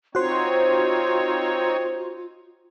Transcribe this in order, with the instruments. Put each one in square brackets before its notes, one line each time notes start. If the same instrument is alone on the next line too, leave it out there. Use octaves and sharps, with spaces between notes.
[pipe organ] C4 D#4 C#5 [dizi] F4 [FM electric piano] F#4 C5